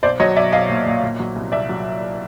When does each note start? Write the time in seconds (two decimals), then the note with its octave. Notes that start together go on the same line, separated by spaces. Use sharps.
0.03 B1 C5 D5
0.20 F#3 C#5 D#5
0.36 B1 D5 E5
0.52 B1 D#5 F5
0.69 A#2
0.86 A#2
1.03 A#2
1.20 F#3
1.36 C2
1.52 C2 D5 E5
1.69 F#3